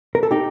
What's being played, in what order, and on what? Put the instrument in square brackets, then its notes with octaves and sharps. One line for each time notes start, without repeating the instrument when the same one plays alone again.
[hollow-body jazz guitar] A#4
A4
D#4 G4